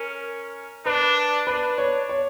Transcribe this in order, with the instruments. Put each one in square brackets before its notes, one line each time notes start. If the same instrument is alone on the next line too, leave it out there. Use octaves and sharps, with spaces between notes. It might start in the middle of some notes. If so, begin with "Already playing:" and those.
Already playing: [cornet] C#4 [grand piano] A#4
[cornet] D4 [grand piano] B4
[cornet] D4 [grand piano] B4
[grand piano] C#5
C#5